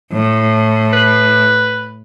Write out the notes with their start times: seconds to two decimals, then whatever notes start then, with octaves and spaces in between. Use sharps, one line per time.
0.12 A2
0.93 B4